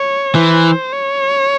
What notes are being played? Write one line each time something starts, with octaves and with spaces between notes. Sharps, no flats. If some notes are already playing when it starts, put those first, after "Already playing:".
Already playing: C#5
E3 C5
C#5